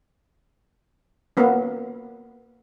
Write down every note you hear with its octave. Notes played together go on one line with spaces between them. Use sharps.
A#3 B3 C#4